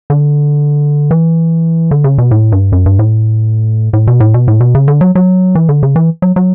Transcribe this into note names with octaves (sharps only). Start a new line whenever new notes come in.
D3
E3
D3
C#3
B2
A2
G2
F#2
G2
A2
A2
B2
A2
B2
A2
B2
C#3
D3
F#3
F#3
E3
D3
C#3
E3
F#3
F#3